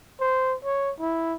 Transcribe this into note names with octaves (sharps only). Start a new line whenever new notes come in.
C5
C#5
E4